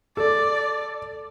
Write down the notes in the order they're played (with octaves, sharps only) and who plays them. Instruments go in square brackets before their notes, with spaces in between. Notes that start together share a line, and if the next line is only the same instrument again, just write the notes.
[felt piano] A4 [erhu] D5